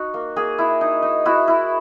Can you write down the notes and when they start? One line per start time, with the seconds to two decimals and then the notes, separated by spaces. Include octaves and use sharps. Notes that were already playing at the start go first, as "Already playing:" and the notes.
Already playing: D#4 F#4
0.14 A#3
0.36 A#3 G#4
0.59 E4
0.81 D#4
1.02 D#4
1.26 E4 F#4
1.48 E4